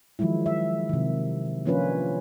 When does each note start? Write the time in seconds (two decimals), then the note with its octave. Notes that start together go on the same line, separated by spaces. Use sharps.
0.19 D#3 F3 F#3 G#3 E4
0.46 E5
0.89 C3 D#3
1.66 F3 A#3 C#4 D4 F4 B4